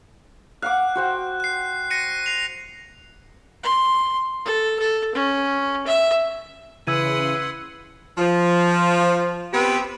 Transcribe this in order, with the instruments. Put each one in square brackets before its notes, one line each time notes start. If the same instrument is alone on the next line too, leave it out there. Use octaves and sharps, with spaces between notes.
[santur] F5 F#5 D6 [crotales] F#6
[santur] F#4 C5 G5
[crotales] F#6 C7
A#6 C#7 D#7
C7 F7
[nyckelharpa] C6
A4
A4
C#4
E5
[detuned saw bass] C#3 [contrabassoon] E3 [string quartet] B4 F#5 C6 [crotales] E6 G#6 D#7
[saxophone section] F3
B3 C4 G4 B4